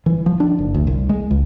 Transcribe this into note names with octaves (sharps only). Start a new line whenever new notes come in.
E3
F3
D4
F#1
D2
C2
G#3
C#2